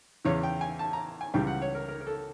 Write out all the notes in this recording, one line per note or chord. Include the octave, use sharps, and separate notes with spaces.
E2 C#3 E3 C#5
G5
G#5
A5
A#5
G#5
C#2 C#3 E3 G3 G5
F#5
C#5
A#4
A#4
A#4
A4